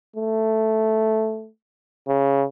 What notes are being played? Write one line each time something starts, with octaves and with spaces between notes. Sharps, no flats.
A3
C#3